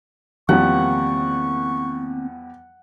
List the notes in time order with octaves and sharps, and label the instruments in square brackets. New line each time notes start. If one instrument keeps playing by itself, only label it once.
[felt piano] E2 F3 G3 [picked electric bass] D#3 A#3 C4 [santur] F#5 [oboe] C#6